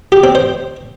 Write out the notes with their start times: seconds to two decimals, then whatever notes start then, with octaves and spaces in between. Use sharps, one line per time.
0.12 G4
0.24 C4
0.35 C5